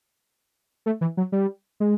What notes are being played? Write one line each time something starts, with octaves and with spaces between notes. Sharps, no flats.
A3
E3
F#3
G3
G#3